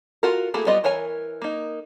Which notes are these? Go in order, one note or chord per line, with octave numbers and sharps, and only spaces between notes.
F4 F#4 A#4
A3 A#3 E4 F#4 G#4
G3 B3 F4 D#5
E3 A#4 C#5 G#5
A#3 D#4